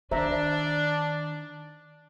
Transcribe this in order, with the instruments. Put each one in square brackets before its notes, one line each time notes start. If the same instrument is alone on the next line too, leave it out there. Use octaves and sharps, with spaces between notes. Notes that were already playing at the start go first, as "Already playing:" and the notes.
[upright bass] D#3 [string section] D4 [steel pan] C5 E5 A#5